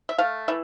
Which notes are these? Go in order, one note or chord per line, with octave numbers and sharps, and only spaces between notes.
E5
A3 F5
E3 E5